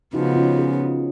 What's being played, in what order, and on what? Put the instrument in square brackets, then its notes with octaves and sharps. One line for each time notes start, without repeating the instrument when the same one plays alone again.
[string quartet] C#3 F3 B3 [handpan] D#4 F#4
[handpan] C#4 F4
F4 G#4